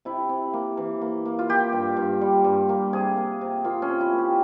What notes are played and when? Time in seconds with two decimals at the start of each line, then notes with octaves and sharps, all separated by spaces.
0.05 C3 E4
0.29 C3
0.54 A#3
0.77 E3
1.02 A#3
1.25 A#3
1.39 F4
1.49 A#3 G4
1.72 G2
1.96 G2
2.21 G3
2.44 G2
2.69 A#3
2.93 C3 G#4
3.17 A#3
3.41 C3
3.65 A#3 F4
3.82 C#4
3.88 C3
4.01 E4
4.13 A#3
4.18 G4